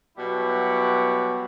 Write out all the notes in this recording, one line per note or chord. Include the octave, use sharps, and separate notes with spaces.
B2 F#3 G3 E4 F#5